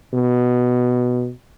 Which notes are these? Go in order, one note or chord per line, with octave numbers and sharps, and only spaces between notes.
B2